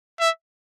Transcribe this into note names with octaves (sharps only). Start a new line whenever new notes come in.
E5